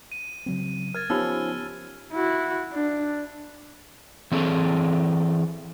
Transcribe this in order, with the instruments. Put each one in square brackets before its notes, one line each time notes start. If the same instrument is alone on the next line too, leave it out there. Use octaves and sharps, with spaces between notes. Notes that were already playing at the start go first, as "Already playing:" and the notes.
[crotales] D#7
[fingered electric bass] C#3 F#3 C4
[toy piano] A#4 [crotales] F6 G#6 A6
[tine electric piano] F3 C#4 [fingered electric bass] B3 [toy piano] D#4 G4 B5 [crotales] E6
[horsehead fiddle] E4 F#4
D4
[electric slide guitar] E3 C4 G#4 A4